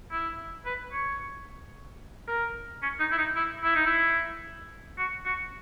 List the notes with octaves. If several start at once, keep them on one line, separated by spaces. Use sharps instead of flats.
E4
B4
C#5
A#4
C#4
D#4
E4
D#4
E4
E4
D#4
E4
F#4
F#4